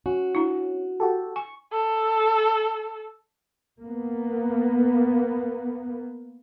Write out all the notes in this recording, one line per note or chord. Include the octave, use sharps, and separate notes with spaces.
C#4 F#4
D4 E4
F#4 G4 A4
G#5 C#6
A4
A#3 B3